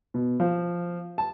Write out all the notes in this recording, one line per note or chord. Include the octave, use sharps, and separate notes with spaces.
B2
F3
A5